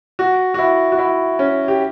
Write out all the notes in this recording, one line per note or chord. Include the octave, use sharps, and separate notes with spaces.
F#4
F#4
E4
F#4
E4
C#4
G4